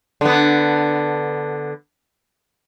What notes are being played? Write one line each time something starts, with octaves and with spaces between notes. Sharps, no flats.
D3 B3